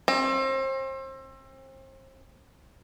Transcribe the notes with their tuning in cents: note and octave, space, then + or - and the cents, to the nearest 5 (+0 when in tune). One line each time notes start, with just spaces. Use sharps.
C4 +35